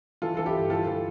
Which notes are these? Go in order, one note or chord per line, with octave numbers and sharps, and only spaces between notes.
E3 F4 A4
E3 A4
E4 G4
G2
E3 F4 A4
E3